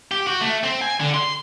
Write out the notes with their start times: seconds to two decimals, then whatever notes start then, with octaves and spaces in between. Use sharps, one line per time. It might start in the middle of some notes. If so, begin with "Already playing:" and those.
0.11 G4
0.27 F#4
0.41 A3
0.63 C4
0.82 G#5
1.00 D3
1.14 C6